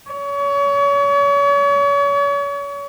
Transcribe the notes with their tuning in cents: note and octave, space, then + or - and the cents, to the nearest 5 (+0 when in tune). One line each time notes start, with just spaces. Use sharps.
C#5 +35